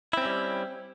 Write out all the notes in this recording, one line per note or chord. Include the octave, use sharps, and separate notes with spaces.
G3 C4 C#4 E4